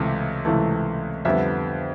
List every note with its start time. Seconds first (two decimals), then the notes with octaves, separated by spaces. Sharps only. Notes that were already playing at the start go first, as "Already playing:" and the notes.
Already playing: C#2 C3 E3 A3
0.45 C#2 C3 E3 A3
1.25 F2 D3 G3 B3 E5